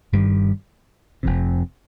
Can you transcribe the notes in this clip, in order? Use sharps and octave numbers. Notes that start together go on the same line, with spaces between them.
G1 G2 D#3 G3
F1 F2 C3